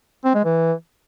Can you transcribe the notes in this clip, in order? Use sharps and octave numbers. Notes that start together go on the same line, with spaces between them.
C4
G#3
E3